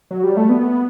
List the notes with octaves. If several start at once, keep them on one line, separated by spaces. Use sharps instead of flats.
F#3
G3
A3
B3